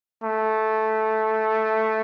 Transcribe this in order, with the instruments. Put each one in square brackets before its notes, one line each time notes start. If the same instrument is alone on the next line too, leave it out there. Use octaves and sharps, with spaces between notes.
[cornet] A3